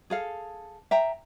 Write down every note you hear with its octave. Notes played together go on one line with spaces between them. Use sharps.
G#4 A4 F5
E5 G5 A#5